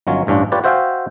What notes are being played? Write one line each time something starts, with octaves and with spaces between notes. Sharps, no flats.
G1 D#3 F#3 C#4 F4 C#5
A1 G2 C#4 D4 F4
F4 G4 B4 C#5 D5
F#4 C5 E5 F5 G5 G#5